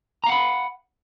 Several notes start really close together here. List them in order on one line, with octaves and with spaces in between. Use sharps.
A#5 F5 F#5 B5